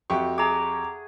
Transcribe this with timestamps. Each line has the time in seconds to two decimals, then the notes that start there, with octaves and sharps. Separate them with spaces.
0.10 F2 A3 F#4 G4 C#6
0.38 G#4 A#5 D6